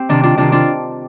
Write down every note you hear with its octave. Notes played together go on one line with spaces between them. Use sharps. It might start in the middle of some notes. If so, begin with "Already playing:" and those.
Already playing: C4 G4
C3 D#3 D4
D4 F4
C3 D#3 D4 F4
D4 F4